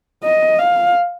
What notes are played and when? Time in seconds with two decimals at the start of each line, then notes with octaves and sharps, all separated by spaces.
0.23 D#5
0.59 F5